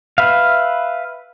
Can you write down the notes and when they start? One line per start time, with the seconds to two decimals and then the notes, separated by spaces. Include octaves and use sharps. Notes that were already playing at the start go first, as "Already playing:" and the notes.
0.18 B4 E5 F5